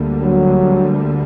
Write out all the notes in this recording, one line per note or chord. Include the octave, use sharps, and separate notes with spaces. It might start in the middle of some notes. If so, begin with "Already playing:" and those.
Already playing: D2 D3 G3 A#3
F#3